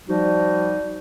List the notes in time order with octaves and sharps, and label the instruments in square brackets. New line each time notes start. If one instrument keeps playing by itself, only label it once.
[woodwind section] F3 G3 D#4 F#4